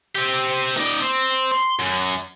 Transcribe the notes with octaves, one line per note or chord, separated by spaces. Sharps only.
C4 G4
D#4 D5
C4
C6
F#2